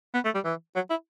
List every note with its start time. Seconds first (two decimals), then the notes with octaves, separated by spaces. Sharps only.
0.14 B3
0.25 A3
0.35 G3
0.45 E3
0.75 F#3
0.90 E4